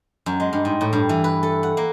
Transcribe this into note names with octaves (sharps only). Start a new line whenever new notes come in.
F#2
G#3
G2
G#2
A2
G2
E3
B4
A4
F#5
A#3